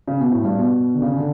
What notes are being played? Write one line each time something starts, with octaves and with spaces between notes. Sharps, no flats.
C#3
B2
A2
G2
B2
D3
C#3
D3